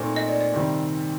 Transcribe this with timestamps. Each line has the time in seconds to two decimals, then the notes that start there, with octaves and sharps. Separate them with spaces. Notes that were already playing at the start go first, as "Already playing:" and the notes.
Already playing: A#2 A3 C4 D#4
0.16 D#5
0.29 D5
0.41 D5
0.53 C3 D#3 G3 C4